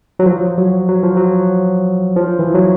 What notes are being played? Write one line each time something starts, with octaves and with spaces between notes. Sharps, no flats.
F#3
F3
F#3
F#3
F3
F#3
F3
E3
F#3